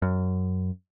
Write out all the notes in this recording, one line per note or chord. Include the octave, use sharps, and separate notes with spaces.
F#2